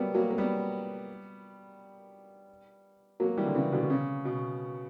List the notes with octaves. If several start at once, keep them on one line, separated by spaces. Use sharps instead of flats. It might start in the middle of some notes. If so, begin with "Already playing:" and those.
Already playing: F#3 G3 A#3 B3
F#3 A#3
A#3
G3 B3
F#3 A#3
E3 G3
D3
C#3 E3
B2 D3
B2
C#3
B2